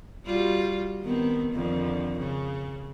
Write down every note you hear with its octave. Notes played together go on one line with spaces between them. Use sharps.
G3 F4 F#4
D#3 B3 C4
F2 D3 D#3
C#3